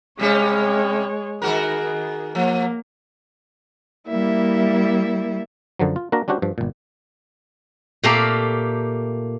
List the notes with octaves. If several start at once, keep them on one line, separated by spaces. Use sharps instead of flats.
C3 G3 G#3 C#4 C#5
D#3 F#4 G#4 A#4
F3 A#3
G3 A#3 E4 E5
F#2 D3 F3 F#3
F4
A#3 D4 F#4 A#4 A#5
G3 C#4 D4 F#4 G4 C5
G2 F3
G1 A#2
A#2 A3 G4 A4 A#4 F5